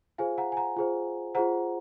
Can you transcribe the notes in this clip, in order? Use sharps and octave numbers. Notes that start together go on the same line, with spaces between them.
F4 G#4 C5 F5 G#5
F#5 A#5
G#5
F#5 A#5
F4 G#4 C5
F4 G#4 C5 F#5 A#5